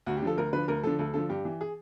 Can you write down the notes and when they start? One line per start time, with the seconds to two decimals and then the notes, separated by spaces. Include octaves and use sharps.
0.06 D2 F#4
0.17 G4
0.22 D3 F3 A4
0.37 D2 A#4
0.53 D3 F3 B4
0.68 D2 A#4
0.83 D3 F3 A4
0.99 D2 A4
1.14 D3 F3 A4
1.29 G2 G4
1.45 E3
1.61 G#4